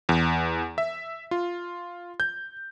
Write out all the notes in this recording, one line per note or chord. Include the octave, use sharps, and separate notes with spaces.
E2
E5
F4
G6